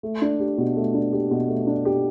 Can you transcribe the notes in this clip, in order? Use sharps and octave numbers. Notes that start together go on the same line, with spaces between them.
A3
D4
G4
B2
A3
D4
G4
B2
A3
D4
G4